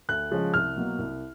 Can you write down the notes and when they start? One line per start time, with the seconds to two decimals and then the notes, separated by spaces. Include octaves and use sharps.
0.09 D2 F#6
0.31 C#3 F3 G#3 C#4
0.54 C2 F6
0.76 B2 F#3 A#3
0.99 C2